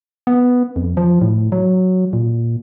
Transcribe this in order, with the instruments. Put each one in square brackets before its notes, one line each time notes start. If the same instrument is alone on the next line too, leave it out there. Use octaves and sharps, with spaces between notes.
[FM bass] B3
F2
F3
A2
F#3
A#2